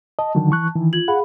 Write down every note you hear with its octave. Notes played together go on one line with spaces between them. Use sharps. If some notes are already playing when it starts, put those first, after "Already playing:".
D#5 A5
D3 D#3 F#3
E3 C#6 F#6
D#3 E3
F4 G#6 F#7
G#4 F5 F#5 B5